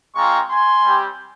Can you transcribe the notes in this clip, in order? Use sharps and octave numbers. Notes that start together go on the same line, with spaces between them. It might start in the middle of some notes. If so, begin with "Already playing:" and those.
G#3 C4 F4 A#5 C#6
G#5 C6
G3 C4 G4